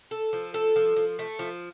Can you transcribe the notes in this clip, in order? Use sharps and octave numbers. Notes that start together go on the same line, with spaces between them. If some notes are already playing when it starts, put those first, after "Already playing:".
A4
F3
A4
F3
F3
A3
F3